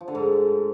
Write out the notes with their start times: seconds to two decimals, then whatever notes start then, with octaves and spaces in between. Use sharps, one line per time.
0.01 F3
0.08 D3
0.15 G#2